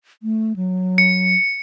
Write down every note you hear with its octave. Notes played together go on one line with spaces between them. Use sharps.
A3
F#3
C#7